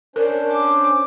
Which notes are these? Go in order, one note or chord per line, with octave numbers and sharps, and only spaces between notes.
C#4 D4 A#4 C5
D6